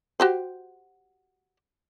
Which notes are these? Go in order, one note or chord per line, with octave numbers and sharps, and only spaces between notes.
F#4 G4 C5